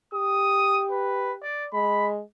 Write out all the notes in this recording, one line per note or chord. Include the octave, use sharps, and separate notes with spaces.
G4 D#6
B4
D5
G#3 B5